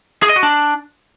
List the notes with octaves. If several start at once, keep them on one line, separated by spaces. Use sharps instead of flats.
G#4
D#5
F#4
D4